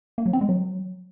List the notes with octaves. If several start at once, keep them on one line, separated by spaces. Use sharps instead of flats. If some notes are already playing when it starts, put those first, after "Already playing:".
A#3
F#3
C4
G#3
F#3